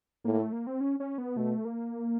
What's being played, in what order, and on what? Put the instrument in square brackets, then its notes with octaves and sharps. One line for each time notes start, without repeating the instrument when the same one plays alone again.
[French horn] A2 [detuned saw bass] A#3
[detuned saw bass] A3
A#3
C4
C#4
C#4
B3
[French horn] B2 [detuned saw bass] A3
[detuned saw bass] A#3